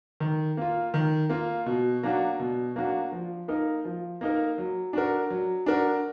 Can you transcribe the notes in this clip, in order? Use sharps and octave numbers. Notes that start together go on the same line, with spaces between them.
D#3
A#3 F4
D#3
A#3 F4
B2
F#3 A#3 D4 F#4
B2
F#3 A#3 D4 F#4
F3
A#3 D#4 A#4
F3
A#3 D#4 A#4
F#3
D4 F#4 A#4
F#3
D4 F#4 A#4